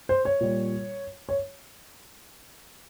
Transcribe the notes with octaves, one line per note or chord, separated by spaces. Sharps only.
C5
C#5
A#2 G3
C#5